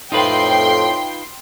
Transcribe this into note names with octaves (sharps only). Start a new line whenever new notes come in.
F2 A2 D#4 F4 B4 G5 C6